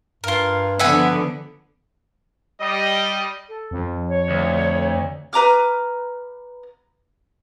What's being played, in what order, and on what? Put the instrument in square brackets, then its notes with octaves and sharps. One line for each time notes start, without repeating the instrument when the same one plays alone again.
[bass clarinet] G2 [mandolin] F4 A#4
[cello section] D3 F3 B3 [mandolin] E5 F#5 G#5
[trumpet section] G3 D#5
[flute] A4
[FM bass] F2
[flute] C#5
[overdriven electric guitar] D2
[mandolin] B4 A#5 D6 F6